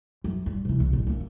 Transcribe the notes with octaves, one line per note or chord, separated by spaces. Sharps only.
F#2
G2
C3 E3
C2
A1
F#2 A#3